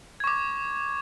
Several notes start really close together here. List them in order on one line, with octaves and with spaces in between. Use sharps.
G#6 C#6 D6